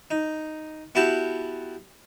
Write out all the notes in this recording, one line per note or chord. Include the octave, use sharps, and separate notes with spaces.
D#4
B3 E4 F#4 G4 G5 A5